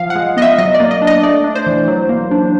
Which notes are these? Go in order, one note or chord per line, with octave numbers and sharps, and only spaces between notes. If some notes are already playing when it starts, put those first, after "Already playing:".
Already playing: F3 F5
F#5
G#3
B3 D#5
E5
F#3 D#5
D5
A#3
D#5
D4
D#5
A3 D5
D4
C5
E3
F#3
A#3
D4